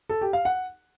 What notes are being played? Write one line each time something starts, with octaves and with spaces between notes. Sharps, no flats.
A4
G4
F5
F#5